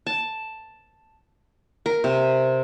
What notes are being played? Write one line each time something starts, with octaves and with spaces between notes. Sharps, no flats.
A5
A#4
C3